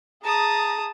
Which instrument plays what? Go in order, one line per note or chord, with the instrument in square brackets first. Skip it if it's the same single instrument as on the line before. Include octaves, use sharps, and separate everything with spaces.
[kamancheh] G#4 A#5 [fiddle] A5 D#6